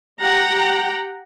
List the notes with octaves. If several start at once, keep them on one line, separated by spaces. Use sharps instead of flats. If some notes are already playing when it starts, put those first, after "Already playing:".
G4 F#5 G5 A#5